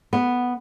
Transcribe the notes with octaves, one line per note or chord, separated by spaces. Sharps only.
B3